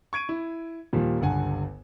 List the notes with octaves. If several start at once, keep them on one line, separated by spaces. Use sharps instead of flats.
C#6 G#6 D7 D#7
E4
D#2 A#2 F3 G3 A#3
G1 C#2 G2 F#5 G#5